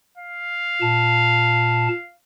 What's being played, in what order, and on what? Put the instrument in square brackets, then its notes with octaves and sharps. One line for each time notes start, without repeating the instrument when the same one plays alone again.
[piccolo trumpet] F5
[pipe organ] A#2 A5